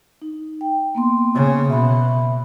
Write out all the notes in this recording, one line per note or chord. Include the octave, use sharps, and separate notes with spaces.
D#4
G5
A#3 B3 C6
C#3
B2 E5 B5